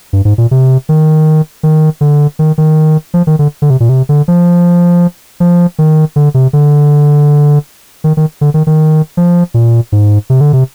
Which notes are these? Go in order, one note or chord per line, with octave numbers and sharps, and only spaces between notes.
G2
G#2
A#2
C3
D#3
D#3
D3
D#3
D#3
F3
D#3
D3
D3
C3
A#2
C3
D3
F3
F3
D#3
D3
C3
D3
D#3
D#3
D3
D#3
D#3
F3
A#2
G#2
C3
D3
C3